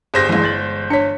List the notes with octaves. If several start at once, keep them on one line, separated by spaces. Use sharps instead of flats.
G1 G4 G#4 C5 A#6
G2 E3 G#3 A3
G6 A6 F#7
D4 C#5 B6 C#7